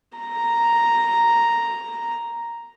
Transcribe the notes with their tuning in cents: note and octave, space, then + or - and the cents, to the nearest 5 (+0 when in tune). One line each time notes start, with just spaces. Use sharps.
A#5 +0